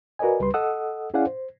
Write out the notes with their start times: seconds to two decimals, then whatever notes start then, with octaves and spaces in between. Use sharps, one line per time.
0.19 F#4 A#4 B4 D5 D#5 G#5
0.40 C#2 G3 B4 C6
0.54 A4 D#5 F#5 D#6 E6
1.14 C#4 E4 G#4 D5 F5 F#5
1.27 C5